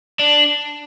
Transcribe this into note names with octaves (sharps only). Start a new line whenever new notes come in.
D4